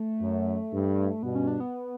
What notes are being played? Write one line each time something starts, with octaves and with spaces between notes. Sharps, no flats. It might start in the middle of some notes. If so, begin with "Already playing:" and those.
Already playing: A3
F#2
G2
G2 B2 B3
C#4
D4
B3